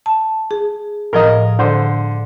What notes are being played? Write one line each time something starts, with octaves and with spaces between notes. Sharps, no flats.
A5
G#4
A2 F3 A#4 D#5
D3 C5